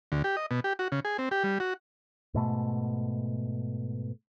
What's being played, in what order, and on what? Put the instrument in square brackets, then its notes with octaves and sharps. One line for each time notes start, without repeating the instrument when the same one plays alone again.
[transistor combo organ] D2
G4
D#5
B2
G4
F#4
C#3
G#4
C4
G4
G3
F#4
[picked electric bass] G#2 B2 A3